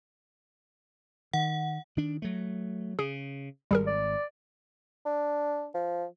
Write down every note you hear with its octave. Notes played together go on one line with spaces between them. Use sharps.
D#3 F#5
D#3 D4
F#3 A3
C#3 G#4
G#1 G3 G#4 A#4
D5
D4
F3